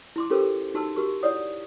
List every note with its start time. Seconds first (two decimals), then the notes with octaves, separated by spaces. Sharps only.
0.16 E4 C6 D6
0.30 C#4 F4 G4 A4 A#4 C5
0.74 D#4 F#4 A5 C6 E6
0.96 F#4 G4 A#4 C#6
1.23 E4 C#5 D5 F#5 D#6